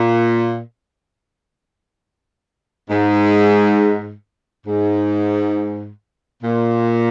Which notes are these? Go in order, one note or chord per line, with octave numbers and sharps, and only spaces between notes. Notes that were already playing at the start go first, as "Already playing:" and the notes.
Already playing: A#2
G#2
G#2
A#2